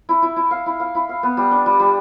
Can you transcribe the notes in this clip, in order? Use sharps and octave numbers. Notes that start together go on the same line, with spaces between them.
E4
E4
E4
F5
E4
F5
E4
F5
B3
G3
D4
G3
G3